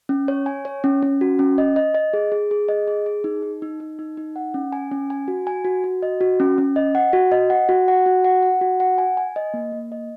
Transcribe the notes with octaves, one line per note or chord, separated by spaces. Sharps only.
C#4
C#5
G#5
C#5
C#4
C#4
F#4
C#4
D#5
D#5
D#5
G#4
G#4
G#4
D#5
G#4
G#4
D#4
D#4
D#4
D#4
D#4
D#4
F#5
C#4
G#5
C#4
G#5
F#4
G#5
F#4
F#4
D#5
F#4
C#4
C#4
D#5
F#5
F#4
D#5
F#5
F#4
F#5
F#4
F#5
F#5
F#4
F#5
G#5
G#5
D#5
A#3
A#3
D#5